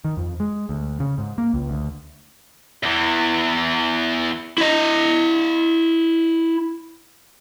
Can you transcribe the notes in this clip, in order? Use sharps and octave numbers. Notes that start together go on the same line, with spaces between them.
D#3
F2
G#3
D2
C#3
G#2
A#3
C#2
D2
E2 E3
E4 D#5